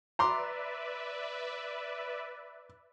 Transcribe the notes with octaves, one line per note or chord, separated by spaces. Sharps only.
B4 D5 E5 A#5 C6 D6